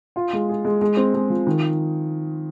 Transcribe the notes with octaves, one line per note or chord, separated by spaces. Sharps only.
F4
G#3
G#4
G#3
G#3
C4
G#3
F3
D#3